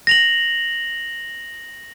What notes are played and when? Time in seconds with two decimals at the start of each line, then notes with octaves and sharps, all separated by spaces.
0.07 A#6 F7 F#7